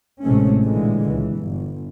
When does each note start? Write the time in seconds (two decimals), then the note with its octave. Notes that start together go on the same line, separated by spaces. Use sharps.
0.24 A1 A2 C3 G#3 A3 C#4
0.63 A#2 D3 E3 G#3
1.04 C#2 E3
1.36 G1